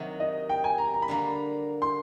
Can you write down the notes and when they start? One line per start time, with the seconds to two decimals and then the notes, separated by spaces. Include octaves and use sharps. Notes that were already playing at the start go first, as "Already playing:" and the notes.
Already playing: C3 D#3 F#3
0.20 D#5
0.49 G5
0.64 G#5
0.78 A#5
0.94 A#5
1.02 B5
1.08 D3 G3 A#3 A#5
1.82 C6